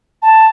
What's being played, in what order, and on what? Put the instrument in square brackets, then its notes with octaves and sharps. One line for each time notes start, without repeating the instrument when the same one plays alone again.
[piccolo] A5